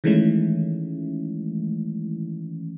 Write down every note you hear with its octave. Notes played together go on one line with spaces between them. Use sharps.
D#3 E3 G#3 A3 C#4 E4